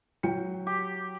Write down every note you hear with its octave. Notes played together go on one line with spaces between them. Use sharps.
F#3 G5 C#7
G4